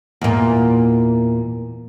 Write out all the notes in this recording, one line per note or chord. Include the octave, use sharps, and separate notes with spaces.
E2 A#2